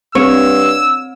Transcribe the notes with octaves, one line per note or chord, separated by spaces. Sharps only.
G2 C4 C#5 E6